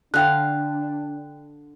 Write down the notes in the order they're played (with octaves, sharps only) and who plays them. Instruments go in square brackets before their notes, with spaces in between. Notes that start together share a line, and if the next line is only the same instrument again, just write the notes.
[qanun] D3 F5 [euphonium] D4 [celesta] G5 F#6